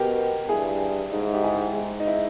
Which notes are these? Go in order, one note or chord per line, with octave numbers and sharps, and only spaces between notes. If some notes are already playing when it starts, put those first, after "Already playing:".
Already playing: B2 G4 A#4
G2 E4 G#4
G#2 D#4
E4
D#4 G4
E4 G#4
G#2
D#4
E4